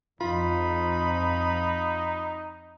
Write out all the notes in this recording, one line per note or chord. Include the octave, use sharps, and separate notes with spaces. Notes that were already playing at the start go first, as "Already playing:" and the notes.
F2 D#4 F4 B5